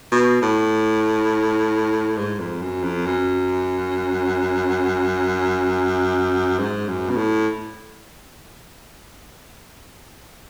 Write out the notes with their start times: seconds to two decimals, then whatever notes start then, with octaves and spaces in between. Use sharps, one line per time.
0.12 B2
0.42 A2
2.18 G#2
2.39 F2
2.61 F#2
2.83 F2
3.06 F#2
6.59 G#2
6.88 F#2
7.09 B2
7.17 A2